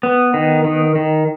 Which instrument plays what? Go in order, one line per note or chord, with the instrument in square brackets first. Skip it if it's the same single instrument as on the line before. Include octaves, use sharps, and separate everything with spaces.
[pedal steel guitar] B3
D#3
D#3
D#3